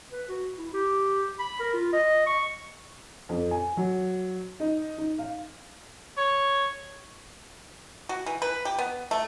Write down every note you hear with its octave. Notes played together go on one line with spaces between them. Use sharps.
B4
F#4
E4
G4
B5
A#4
F4
D#5
C#6
F2
G#5
F#3
D#4
D#4
F5
C#5
F#4
E3
B4
G4
B3
A3